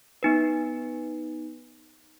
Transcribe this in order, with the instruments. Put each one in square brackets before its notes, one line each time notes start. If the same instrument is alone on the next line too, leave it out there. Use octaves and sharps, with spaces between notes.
[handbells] B3 D#4 B4